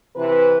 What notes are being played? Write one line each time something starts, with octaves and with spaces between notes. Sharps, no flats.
C3 E3 B4